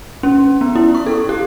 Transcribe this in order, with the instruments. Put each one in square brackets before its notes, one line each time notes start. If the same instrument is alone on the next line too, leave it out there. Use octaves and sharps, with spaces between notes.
[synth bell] C#4
B3
E4
C#6
A4
G4